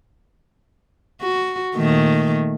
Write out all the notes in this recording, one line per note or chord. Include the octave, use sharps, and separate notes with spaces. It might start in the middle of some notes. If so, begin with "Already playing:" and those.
F#4
A#2 D#3 A3